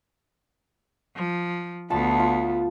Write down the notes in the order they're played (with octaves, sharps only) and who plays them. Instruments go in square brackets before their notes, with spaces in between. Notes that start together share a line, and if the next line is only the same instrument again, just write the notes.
[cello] F3
[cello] D2 B3 [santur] F4 A5
[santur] F4